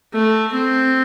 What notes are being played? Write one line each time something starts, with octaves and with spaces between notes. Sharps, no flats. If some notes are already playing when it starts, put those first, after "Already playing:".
A3
C4